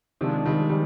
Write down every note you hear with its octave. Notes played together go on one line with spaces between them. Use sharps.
C3 D#3 F3 G#3 D4
D#3 G3
D#3 G3